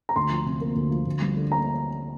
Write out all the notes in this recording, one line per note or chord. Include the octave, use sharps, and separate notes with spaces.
A#5
D2 C6
F3
C3
A#3
D2
F3
D2
G3
D3
A#3 A#5